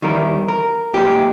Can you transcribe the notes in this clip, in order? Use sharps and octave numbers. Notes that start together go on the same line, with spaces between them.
E2 D#3 G3 A#4
A#4
B1 A#2 G#3 G4